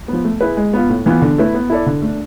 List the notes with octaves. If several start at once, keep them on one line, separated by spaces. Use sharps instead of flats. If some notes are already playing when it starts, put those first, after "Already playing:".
F3 B3
A3
E4 G#4 B4
G#3
B3 F4
A2
E3 B3 F4
D3
A3 E4 B4
B3
E4 A4 D5
D3
A3 D4